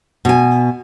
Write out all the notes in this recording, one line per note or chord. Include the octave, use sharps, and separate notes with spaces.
B2 G#5